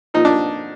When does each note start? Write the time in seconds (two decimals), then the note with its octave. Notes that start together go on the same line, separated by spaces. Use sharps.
0.14 A#2 F3 D#4
0.25 D4